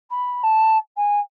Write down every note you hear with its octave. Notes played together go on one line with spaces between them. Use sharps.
B5
A5
G#5